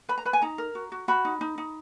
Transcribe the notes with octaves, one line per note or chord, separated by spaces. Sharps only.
B4 B5
A#5
B4 B5
G#5
D#4 A#5
A#4
F#4
F#4
F#4 B5
D#4
D#4
D#4